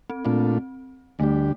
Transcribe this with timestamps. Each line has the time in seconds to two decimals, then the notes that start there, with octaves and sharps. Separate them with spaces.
0.10 C4
0.25 A#2 A3 C4 D4 F4
1.19 D2 D3 G3 A3 D4 G4